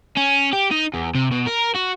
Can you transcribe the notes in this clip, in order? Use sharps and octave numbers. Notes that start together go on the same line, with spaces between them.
C#4
G4
D#4
E2
C3
B2
A#4
F#4